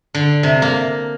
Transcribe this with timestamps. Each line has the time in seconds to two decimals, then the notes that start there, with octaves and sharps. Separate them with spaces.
0.14 D3
0.43 C3
0.62 A#3